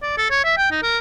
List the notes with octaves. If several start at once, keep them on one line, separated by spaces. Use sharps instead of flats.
D5
A4
C#5
E5
G5
D#4
A#4